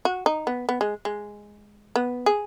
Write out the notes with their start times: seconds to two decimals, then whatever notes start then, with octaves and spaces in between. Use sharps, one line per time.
0.05 F#4
0.26 D#4
0.47 B3
0.69 B3
0.81 G#3
1.05 G#3
1.96 B3
2.26 G#4